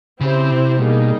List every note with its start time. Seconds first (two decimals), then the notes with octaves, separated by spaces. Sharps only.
0.20 C#3 C4 E4 G4 C5
0.51 C3
0.80 B2 G3 A#3 D#4 G#4